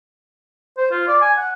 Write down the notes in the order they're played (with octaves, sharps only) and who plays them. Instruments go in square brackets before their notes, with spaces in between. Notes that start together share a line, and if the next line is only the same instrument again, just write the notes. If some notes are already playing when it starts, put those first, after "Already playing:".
[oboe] C5
F4
D5
G#5
F#5